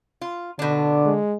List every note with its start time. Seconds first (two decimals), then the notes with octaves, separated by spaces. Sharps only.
0.21 F4
0.59 B2 D3 D4
1.06 G#3